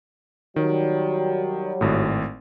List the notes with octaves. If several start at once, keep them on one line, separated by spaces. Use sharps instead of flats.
D#3 F#3 G3
G#1 A2